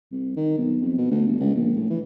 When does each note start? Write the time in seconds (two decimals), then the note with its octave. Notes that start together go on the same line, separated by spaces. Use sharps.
0.11 C2
0.36 D#3
0.57 B1
0.81 F2
0.97 B2
1.11 D2
1.27 G1
1.40 C#2
1.55 A#1
1.76 A2
1.90 E3